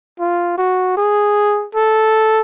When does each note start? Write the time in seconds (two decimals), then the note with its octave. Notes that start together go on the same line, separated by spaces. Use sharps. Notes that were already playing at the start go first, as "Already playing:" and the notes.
0.20 F4
0.58 F#4
0.97 G#4
1.75 A4